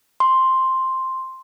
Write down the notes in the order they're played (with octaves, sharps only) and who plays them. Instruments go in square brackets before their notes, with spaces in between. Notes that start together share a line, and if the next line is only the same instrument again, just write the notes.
[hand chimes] C6